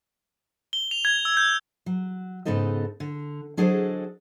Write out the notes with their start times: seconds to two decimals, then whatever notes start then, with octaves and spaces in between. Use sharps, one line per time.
0.73 G7
0.91 F7
1.05 G#6
1.25 E6
1.37 G6
1.86 F#3
2.45 G#2 C#3 B3 D#4 A4 D#5
3.00 D3
3.57 F#3 D4 G#4 A4 C5 D#5